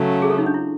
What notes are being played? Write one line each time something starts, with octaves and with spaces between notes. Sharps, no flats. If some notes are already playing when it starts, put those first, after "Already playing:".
Already playing: C#3 F#3 A3
G#4
A4
D#4
D4
E4